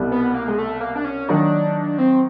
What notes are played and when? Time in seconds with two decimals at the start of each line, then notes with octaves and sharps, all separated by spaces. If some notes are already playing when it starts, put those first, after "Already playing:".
Already playing: C2 B2 G3
0.11 B3
0.34 A#3
0.48 G#3
0.58 A3
0.81 A#3
0.95 D4
1.04 C#4
1.28 D#3 F#3 A#3 D4 D#4 F#4
1.98 C4